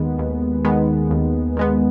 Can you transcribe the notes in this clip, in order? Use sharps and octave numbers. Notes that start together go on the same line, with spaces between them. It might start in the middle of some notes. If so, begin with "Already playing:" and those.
Already playing: D#2 D#3 G#3 B3
D#2
D#3 G#3 B3
D#2
D#3 G#3 B3